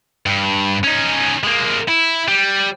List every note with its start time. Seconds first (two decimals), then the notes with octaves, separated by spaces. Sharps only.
0.26 G2
0.84 C#4 D#4
1.44 G#3 A#3
1.89 E4
2.28 G3